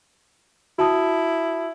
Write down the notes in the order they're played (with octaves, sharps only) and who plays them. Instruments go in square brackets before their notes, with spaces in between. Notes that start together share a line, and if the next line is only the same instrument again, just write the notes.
[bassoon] E4 [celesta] F#4 A5 D#6